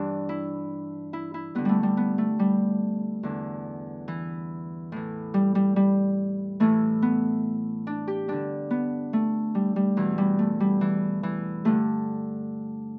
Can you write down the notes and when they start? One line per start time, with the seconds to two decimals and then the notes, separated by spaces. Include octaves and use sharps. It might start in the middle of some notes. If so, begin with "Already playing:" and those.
Already playing: G2 E3 D4
0.29 E4
1.13 E4
1.34 E4
1.55 G2 D3 B3
1.65 G3 A3
1.83 G3
1.97 B3
2.18 A3
2.39 G3
3.23 E2 D3
4.08 E3
4.92 A2 E3
5.34 G3
5.55 G3
5.76 G3
6.60 A2 E3 A3
7.02 B3
7.87 D4
8.07 G4
8.28 G2 D3 D4
8.70 B3
9.13 A3
9.55 G3
9.76 G3
9.97 E2 B2 E3
10.18 G3
10.39 A3
10.60 G3
10.81 E3
11.23 E3
11.65 G2 D3 A3